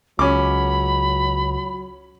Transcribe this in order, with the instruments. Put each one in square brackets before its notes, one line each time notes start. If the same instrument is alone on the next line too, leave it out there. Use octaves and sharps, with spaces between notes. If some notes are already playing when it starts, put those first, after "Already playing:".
[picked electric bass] C#2 [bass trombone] F#3 [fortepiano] C#4 D6 [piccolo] B5